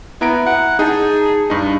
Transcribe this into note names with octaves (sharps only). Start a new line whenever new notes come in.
B3 E4 A#5 D7
F#5
D#4 G#4 A5
G2 D#4